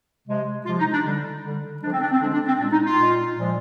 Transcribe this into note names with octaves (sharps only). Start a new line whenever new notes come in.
C3 F3 G#3
C3 F3 G#3 F4
D#4
D4
D3 G3
D3 G3
D3 F3 G#3 D4
C4
D4
C4
D3 F3 G#3 D4
D4
C4
A#2 G#3 D4
D#4
F4
A#2 G#3
A#2 F3 G#3